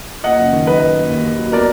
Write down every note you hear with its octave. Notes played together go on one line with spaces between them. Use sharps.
A#3 D#5 F#5
F#1
D#3
F#2 B4 D#5
F#2
A#3
D#2
D#2
F#3
B3 A#4 D5